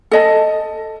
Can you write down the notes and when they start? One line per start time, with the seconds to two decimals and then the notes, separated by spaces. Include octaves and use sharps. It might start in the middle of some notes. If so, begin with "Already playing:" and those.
0.11 A4 D#5 A5